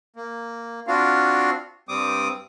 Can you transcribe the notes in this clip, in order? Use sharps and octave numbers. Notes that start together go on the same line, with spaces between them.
A#3
C4 D4 F4 F#4 F5
G2 G3 C4 D6 D#6